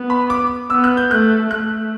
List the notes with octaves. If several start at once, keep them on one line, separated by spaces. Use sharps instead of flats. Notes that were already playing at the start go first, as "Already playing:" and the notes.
Already playing: B3
B5
D6
B3 E6
F#6
G6
A3 F#6
A3 F#6